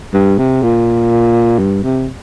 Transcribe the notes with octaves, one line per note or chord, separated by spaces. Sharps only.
G2
C3
A#2
G2
C3